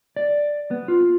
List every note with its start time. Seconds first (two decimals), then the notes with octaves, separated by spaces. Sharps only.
0.16 D5
0.71 B3
0.88 F4